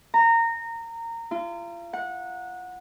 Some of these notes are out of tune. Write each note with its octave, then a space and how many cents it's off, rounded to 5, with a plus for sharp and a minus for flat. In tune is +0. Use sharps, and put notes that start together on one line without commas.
A#5 -20
F4 -35
F#5 -20